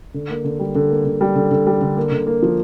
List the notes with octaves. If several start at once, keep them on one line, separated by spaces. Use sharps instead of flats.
D3
A#3
D3
G3
D3
A#3
D3
G3
D3
D3
G3
D3
A#3
D3
A#3
F3